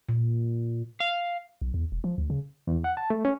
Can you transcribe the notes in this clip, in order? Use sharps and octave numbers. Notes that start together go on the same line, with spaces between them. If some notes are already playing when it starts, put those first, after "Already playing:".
A#2
F5
B1
E2
E1
F3
D2
C#3
E2
F#5
A5
A3
C#4